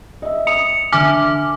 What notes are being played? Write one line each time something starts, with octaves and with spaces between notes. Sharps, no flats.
D#5 E5
D#6 C#7 F7
D3 D4 E5 G#5 D6 F6